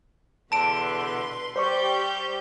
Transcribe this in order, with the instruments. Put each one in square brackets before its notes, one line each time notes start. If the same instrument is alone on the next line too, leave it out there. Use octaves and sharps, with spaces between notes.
[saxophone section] E2 D3 [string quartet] B2 B4 C6 [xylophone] A5 D7
[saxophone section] G3 [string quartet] G4 G6 [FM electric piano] C5 D5 C#6